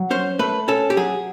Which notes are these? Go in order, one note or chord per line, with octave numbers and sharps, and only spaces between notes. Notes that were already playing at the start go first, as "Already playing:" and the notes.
Already playing: F#3
C#4 C5
A3 B4
C#4 A4
G4
F#3 G#4